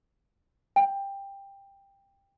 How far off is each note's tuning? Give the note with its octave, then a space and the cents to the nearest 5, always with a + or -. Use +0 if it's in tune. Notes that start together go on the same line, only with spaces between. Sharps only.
G5 +15